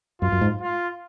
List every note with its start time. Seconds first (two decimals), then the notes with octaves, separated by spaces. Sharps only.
0.22 F#2 F4
0.32 F#2
0.41 G#2
0.61 F4